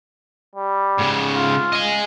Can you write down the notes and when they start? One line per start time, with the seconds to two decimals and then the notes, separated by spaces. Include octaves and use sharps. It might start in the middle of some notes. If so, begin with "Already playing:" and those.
0.55 G3
0.98 G#2 C#3
1.34 F4
1.73 D#5 G#5